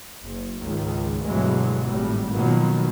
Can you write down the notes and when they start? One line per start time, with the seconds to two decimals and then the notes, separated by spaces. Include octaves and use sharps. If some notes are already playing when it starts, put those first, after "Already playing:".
0.25 F#1
0.60 C#2 G#2 D#3
1.24 D2 G2 B2 E3 F#3 G#3
1.86 G#1 A2 G3
2.31 B2 D#3 F3 F#3 A#3 B3